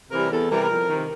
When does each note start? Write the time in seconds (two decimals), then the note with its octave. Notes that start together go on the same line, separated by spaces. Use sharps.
0.11 C3 E3 G3 A#4
0.30 E2 A4
0.50 C3 E3 G3 A#4
0.68 F2
0.87 C3 D#3